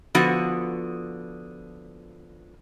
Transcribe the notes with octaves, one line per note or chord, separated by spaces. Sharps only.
D3 F3 B3 F#4